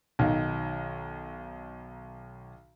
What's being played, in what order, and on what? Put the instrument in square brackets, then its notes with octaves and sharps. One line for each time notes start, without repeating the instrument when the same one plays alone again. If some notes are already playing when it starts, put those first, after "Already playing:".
[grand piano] B1 D#3 F5